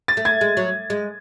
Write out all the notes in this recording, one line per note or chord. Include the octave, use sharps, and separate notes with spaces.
A6
A3
G#6
G#3
F#3
G#3